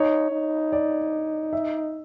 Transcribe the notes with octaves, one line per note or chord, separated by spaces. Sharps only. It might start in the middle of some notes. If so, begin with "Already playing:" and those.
Already playing: D#4 C#5
D#4
D5
E5